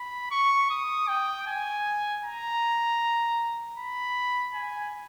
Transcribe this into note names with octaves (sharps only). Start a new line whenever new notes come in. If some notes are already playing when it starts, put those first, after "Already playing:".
Already playing: B5
C#6
D#6
G5
G#5
A#5
B5
G#5